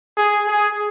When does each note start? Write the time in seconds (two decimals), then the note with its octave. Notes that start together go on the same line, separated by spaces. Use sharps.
0.17 G#4
0.48 G#4